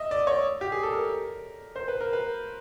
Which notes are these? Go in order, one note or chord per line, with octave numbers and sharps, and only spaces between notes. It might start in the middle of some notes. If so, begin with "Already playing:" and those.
Already playing: D#5 E5
D5
C#5
G4
G#4
A4
A#4
C5
B4
A#4
B4